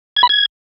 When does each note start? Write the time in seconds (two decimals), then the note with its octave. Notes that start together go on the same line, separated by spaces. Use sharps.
0.17 G#6
0.23 B5
0.29 G#6